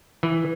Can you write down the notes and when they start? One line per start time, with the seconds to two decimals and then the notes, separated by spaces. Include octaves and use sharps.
0.23 E3